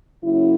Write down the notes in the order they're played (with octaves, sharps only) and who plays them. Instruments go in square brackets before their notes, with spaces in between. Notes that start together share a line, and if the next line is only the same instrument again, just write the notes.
[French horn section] C#3 F#3 A#3 C#4 E4